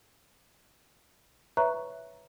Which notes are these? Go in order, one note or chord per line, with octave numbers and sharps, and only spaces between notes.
B4 C#5 E5 A#5 C#6 F#6